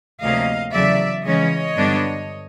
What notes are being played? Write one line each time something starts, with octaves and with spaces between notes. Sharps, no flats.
D2 C3 F3 A#3 C#4 D#5 F5
E2 C#3 F#3 A3 D5 E5
C#3 E3 G#3 C#4 C#5 D#5
G2 D3 G3 B3 D4